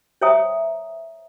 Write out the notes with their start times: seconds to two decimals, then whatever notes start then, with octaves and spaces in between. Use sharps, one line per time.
0.22 C5 C#5 E5 G5 A#5 D#6